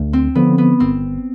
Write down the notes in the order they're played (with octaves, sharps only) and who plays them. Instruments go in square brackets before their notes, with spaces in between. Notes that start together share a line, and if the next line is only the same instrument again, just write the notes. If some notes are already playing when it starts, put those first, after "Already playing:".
Already playing: [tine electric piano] D2
[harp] C4
[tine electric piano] D3 F3 [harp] B3
[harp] B3
[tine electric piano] G1 [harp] C4